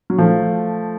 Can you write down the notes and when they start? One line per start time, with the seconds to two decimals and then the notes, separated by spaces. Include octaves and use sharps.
0.10 F#3
0.18 F3 A3